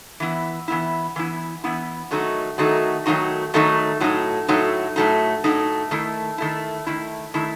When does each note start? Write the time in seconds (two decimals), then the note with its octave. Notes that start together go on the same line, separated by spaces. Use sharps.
0.20 E3 B3 E4
0.68 E3 B3 E4
1.16 E3 B3 E4
1.64 E3 B3 E4
2.11 D#3 F#3 A3 D#4 F#4
2.58 D#3 F#3 A3 D#4 F#4
3.06 D#3 F#3 A3 D#4 F#4
3.54 D#3 F#3 A3 D#4 F#4
4.00 A2 F#3 A3 D#4
4.48 A2 F#3 A3 D#4
4.96 A2 F#3 A3 D#4
5.44 A2 F#3 A3 D#4
5.91 D#3 A3 E4
6.38 D#3 A3 E4
6.86 D#3 A3 E4
7.34 D#3 A3 E4